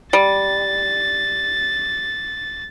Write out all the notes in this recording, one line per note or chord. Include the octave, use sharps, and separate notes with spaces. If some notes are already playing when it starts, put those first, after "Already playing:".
G3 A6